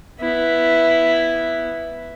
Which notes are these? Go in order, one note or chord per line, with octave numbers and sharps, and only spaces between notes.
B3 E4